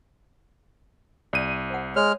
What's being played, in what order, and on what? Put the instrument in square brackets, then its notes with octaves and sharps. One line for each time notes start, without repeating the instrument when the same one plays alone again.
[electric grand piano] C2 D#7 [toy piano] D5
[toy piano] C5 F#5
[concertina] G#3 F6 [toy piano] C#5